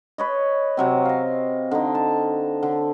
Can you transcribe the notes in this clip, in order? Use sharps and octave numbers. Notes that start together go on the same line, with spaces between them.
B4 C#5 D#5
C3 F#3 C4
D#5 F5
D3 D#4
A5
D3